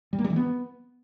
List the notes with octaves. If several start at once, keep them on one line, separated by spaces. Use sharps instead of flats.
G3
A#3
G3
E3
B3